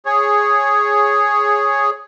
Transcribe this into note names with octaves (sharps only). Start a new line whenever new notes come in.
G#4 C#5